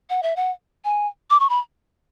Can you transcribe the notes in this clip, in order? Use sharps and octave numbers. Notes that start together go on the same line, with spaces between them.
F#5
E5
F#5
G#5
D6
C#6
B5